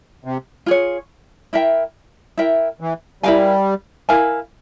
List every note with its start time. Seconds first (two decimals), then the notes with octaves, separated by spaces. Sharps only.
0.25 C3
0.66 F4 G#4 C#5
1.53 E4 A#4 E5 G5
2.38 E4 A#4 E5 G5
2.81 E3
3.23 G3 E4 A#4 F5 G#5
4.09 E4 A#4 F5 G#5